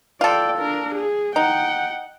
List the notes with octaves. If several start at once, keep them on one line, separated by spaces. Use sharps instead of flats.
F4 A4 D5 G5
D4 A#4
G#4
D#4 F#5 G5